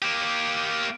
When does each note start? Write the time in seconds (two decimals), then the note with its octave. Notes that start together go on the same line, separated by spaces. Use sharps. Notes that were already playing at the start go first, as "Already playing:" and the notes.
0.02 A#3 G4